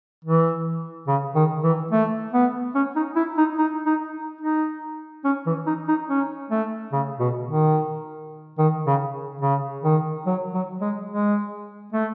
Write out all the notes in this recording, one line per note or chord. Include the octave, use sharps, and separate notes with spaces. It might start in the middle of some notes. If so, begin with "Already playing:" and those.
E3
C#3
D#3
E3
A3
B3
C#4
D#4
E4
D#4
D#4
D#4
D#4
C#4
E3
D#4
D#4
C#4
A3
C#3
B2
D#3
D#3
C#3
C#3
D#3
F#3
F#3
G#3
G#3
A3